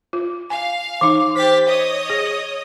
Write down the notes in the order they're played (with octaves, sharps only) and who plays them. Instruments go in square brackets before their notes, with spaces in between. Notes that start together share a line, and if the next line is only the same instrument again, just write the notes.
[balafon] F4
[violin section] F5 [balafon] G#5
[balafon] E3 D#4 [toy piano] D6
[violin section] G4 A6 B6 [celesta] C5
[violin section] C#5 D#5 D#6
[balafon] G#4 [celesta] A#6 F7